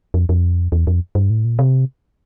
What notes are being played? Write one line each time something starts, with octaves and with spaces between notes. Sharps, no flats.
F2
F2
E2
F2
G2
A2
A#2
C3